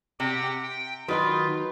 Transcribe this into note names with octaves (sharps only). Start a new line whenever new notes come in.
C3 G4 F#5 G5
G5
D#3 F#3 F4 B4 D#5 C6